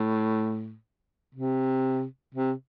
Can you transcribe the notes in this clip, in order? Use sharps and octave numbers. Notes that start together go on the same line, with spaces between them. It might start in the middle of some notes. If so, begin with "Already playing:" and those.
Already playing: A2
C3
C3